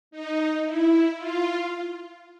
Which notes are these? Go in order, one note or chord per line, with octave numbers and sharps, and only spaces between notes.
D#4
E4
F4